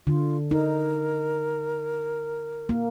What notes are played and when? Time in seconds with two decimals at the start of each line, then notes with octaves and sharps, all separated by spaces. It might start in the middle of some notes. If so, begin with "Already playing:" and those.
0.07 D3 F4
0.51 D#4 A#4
2.69 A#3